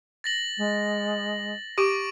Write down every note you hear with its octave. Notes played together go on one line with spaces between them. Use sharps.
A6 A#6 F#7
G#3
G4 C#6 D6 D7